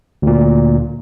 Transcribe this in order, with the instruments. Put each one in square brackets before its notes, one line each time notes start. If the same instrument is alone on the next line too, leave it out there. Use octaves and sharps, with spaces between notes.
[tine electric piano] D2 A#2